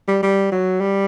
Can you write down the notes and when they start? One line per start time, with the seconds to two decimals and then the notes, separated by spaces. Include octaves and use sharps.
0.08 G3
0.23 G3
0.52 F#3
0.81 G3